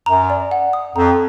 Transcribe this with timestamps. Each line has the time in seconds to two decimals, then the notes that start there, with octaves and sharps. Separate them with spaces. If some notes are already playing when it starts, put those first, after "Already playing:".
0.06 F#2 A#5
0.30 D5
0.51 F#5
0.73 D#6
0.95 F2 A#5